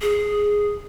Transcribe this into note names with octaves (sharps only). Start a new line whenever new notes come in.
G#4